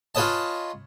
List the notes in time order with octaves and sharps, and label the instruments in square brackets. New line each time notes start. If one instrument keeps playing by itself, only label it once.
[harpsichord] F4 G#4 B4 C#5 D#5 A5